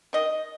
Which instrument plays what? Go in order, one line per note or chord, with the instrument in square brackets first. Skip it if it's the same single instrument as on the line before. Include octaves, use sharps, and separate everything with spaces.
[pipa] D#3 D#5